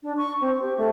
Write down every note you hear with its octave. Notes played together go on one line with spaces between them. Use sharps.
D4
C#6
C4
G4
A3